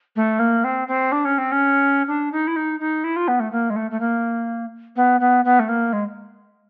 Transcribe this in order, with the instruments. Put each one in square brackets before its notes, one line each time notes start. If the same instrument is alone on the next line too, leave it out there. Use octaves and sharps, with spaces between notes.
[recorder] A3
A#3
C4
C4
D4
C#4
C4
C#4
D4
D#4
E4
D#4
D#4
E4
F4
B3
A3
A#3
G#3
A3
A3
A#3
B3
B3
B3
A3
A#3
G#3